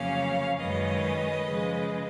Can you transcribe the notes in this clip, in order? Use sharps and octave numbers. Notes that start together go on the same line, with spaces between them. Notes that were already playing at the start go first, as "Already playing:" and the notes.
Already playing: F2 C#3 F#3 A#3 C#4 C#5 F5
F#2 D#3 G#3 C#4 B4 D#5
C#3 F3 G#3